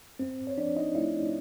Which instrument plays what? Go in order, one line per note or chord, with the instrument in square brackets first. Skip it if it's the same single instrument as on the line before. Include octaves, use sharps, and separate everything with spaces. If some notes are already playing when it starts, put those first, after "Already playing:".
[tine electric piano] F#2 C4 C5
C#5
F3 D4 D5
D#4 D#5
A3 E4 E5